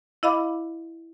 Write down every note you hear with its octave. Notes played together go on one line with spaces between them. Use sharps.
E4 D#5 F5 B5 D6